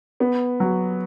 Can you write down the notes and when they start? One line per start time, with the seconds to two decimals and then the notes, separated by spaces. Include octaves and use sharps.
0.20 B3
0.60 F#3